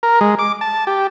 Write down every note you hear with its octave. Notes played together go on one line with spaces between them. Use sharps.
A#4
G#3
D6
A5
G4